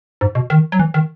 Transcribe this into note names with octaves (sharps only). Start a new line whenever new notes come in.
G#2
B2
D#3
F#3
E3
D#3